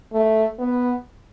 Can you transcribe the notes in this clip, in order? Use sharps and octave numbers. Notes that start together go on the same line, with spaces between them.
A3
B3